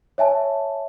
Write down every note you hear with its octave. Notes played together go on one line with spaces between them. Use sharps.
C#5 E5 G#5 A5